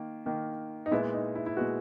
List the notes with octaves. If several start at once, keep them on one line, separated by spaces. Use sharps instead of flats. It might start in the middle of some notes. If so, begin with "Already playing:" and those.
Already playing: D#3 A#3
D#3 A#3
D#4
A#2 G#3 B3 E4
D#4
E4
E4
A#2 G#3 B3 F#4